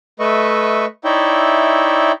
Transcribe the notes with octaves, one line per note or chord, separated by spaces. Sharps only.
A3 B4 D#5 E5 C#6
D#4 E4 C#5 D5 E5 G5